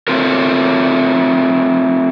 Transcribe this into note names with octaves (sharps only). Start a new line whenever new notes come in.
A3 C4 F4 A#4